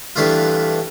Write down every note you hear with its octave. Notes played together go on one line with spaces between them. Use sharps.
G2 E3 A3 D4 F4